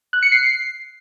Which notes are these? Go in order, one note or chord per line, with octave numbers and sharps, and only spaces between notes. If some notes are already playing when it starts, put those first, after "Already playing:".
F#6
C#7
C7